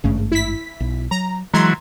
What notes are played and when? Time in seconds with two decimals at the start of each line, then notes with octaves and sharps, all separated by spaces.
0.04 G#1 G2 C#3 A3
0.32 E4 B6
0.80 B1
1.11 F#3 A#5
1.54 E3 F#3 G#3 A#5 C6 G#6